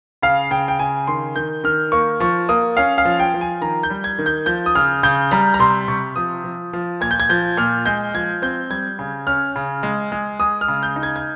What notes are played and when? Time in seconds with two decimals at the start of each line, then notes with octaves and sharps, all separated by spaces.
0.22 C#3 F5
0.51 C#3 G5
0.68 G5
0.79 C#3 G#5
1.07 D#3 C6
1.36 D#3 G6
1.64 D#3 F6
1.92 A#3 C#6
2.20 F3 C#6
2.49 A#3 D#6
2.77 C#4 F5
2.98 F5
3.05 F3
3.20 G5
3.34 F3
3.41 G#5
3.61 D#3 A#5
3.83 G6
3.90 G3
4.04 G#6
4.19 D#3
4.26 G6
4.46 F3 G6
4.66 D#6
4.75 C#3 F6
5.03 C#3 G6
5.31 G3 A#5
5.54 A#5
5.59 C3 C6
5.88 C3 C#6
6.16 F3 D#6
6.44 F3
6.73 F3
7.01 A#2 G#6
7.11 G6
7.20 G#6
7.29 F3 G6
7.57 A#2 F6
7.86 G#3 G6
8.15 F3 G#6
8.42 C4 G6
8.70 G3 G#6
8.99 C#3
9.27 C#4 F6
9.56 C#3
9.83 G#3
10.12 G#3
10.40 G#3 D#6
10.61 F6
10.68 C#3
10.83 G6
10.96 D#4
11.03 G#6
11.16 G#6